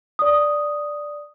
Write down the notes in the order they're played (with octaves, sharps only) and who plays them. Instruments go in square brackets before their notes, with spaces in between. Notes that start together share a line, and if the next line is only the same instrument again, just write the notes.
[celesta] D5 D#6